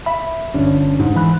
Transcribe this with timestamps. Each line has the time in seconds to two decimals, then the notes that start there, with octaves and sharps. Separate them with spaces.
0.06 E5 B5
0.54 G1 C#4 D4
0.99 G#2
1.16 E3 B5 F#6